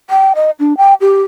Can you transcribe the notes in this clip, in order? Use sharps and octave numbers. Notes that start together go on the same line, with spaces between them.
G5
D#5
D4
G5
G4